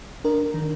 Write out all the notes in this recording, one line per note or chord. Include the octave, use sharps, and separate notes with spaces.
D4 A#4
D#3